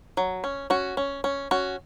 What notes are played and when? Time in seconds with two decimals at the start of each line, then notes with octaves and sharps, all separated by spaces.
0.17 F#3
0.44 C#4
0.70 C#4 F#4
0.97 C#4
1.24 C#4
1.51 C#4 F#4